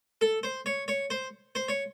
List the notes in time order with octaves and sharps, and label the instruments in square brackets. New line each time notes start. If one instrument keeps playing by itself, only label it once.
[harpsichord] A4
C5
C#5
C#5
C5
C5
C#5